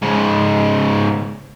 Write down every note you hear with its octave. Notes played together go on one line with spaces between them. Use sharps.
G#2 C#3